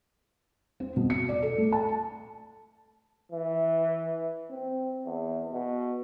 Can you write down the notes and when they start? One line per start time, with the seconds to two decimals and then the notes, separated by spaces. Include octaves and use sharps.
0.80 C4
0.96 B2
1.10 C#7
1.29 D5
1.42 A4
1.58 A3
1.72 A5
3.32 E3
4.50 C4
5.05 E2
5.52 B2